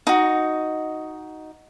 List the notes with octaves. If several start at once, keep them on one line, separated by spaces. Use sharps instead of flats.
D#4 F#4